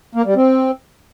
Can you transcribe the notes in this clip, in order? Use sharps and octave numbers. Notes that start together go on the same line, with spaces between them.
A#3
G3
C4